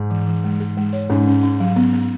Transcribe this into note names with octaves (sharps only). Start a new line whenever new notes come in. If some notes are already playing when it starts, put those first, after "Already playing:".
Already playing: G#2
E3
E3
G#3
G#4
G#3
C#5
G#2 C#4
C#4
C#4
F#3
B3
B3